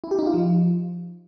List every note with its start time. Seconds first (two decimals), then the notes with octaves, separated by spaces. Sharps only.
0.04 E4
0.11 G4
0.19 D#4
0.26 F4
0.34 F3